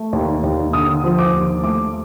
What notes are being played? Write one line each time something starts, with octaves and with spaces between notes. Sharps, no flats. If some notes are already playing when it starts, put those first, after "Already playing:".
Already playing: A3
D#2
D#2
D3 D#6
F3
D6
D#2
A3 D6